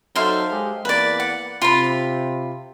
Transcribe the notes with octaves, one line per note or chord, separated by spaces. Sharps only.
F#3 D#4 A4 C5 E5 F5
G#3 G4
E2 A#3 B4 D5
F#5
C3 F4 B5